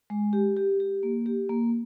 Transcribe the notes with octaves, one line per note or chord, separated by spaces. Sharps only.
G#3
G4
G4
G4
A#3
G4
A#3